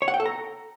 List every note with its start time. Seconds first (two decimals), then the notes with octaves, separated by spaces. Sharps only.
0.02 C#5
0.08 F#5
0.14 G5
0.20 A4
0.26 A#5